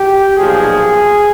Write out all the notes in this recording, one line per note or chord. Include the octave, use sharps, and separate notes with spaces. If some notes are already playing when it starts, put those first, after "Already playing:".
Already playing: G4
B1 A#2 F3 G#4